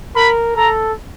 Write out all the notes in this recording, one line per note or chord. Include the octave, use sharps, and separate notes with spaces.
A#4 B5
A4 A#5